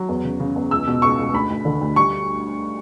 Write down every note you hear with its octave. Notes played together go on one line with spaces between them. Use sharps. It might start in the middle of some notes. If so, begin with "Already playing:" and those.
Already playing: F#3
E2
C#3
C#3
E2
C#2 E6
B2
C#2 C#6
C#2
D2 B5
D2
D3
D2
G3 C#6